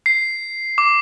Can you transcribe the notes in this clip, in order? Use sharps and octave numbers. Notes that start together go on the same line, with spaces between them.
C7
D6